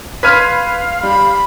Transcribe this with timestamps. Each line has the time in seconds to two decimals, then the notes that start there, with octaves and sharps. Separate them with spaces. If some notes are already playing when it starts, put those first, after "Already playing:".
0.23 B4 F5 C6 F6 G#6 B6 D#7
1.03 G3 B5